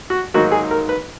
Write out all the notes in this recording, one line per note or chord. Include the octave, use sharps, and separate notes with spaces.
F#4
G#2 D#3 F#3 A#3 D#4 F#4
G#4
A#4
B4